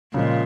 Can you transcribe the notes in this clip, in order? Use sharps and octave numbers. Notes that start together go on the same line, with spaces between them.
A#2 C#3 F3 G#3